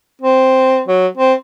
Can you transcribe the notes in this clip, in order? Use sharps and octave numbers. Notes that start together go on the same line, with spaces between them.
C4
F#3
C4